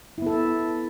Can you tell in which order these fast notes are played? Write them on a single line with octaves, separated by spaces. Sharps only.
E4 B3 A4